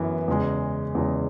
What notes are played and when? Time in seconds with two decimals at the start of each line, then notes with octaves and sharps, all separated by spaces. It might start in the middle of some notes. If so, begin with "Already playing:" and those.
Already playing: F#2 E3 B3
0.28 E2 C#3 G#3
0.95 E2 C#3 G#3